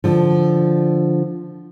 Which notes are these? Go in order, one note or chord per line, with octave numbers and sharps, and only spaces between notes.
D3 F3